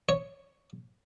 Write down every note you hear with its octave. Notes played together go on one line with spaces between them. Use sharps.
C#5